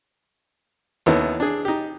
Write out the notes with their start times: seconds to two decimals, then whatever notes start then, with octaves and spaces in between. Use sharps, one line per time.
1.06 D#2 D#3 B3 C#4 E4 A4
1.40 D4 G#4
1.65 D#4 G4